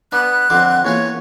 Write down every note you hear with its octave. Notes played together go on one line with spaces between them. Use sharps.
B3 D4 F#6
F2 D3 C4 F#5 D6
E2 A#3 C#4 F4 C#5